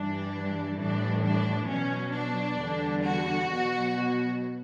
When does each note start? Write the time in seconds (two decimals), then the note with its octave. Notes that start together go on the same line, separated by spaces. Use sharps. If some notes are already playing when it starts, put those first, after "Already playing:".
Already playing: G2 E3 G3 D4
0.79 A2 E3 G3 D4
1.23 D4
1.68 B2 F#3 C#4
2.14 D4
2.58 E2 D3 G3
3.03 F#4
3.48 B2
3.53 F#3